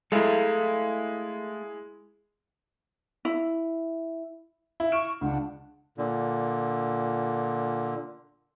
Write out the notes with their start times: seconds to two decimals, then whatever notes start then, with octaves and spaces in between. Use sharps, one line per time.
0.12 G#3 A3 E4 A4 F5
3.25 E4
4.80 E4
4.92 C#6 F6 D7 E7
5.21 C#2 D4 F#5
5.98 A#2 D3